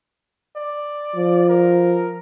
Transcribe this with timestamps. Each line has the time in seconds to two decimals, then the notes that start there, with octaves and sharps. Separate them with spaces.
0.56 D5
1.15 F3
1.49 A#4